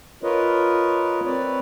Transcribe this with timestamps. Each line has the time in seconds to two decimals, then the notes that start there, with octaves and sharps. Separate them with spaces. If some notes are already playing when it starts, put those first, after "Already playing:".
0.23 F4 A#4 B4 C#5 D#5
1.25 C4 B4 C#5 D5